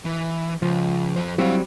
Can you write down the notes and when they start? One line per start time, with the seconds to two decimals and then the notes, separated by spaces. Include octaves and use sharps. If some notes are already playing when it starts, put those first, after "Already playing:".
0.05 E3
0.62 C#2 F3
1.16 F2 C5
1.38 F#3 G3 C4 E4 F5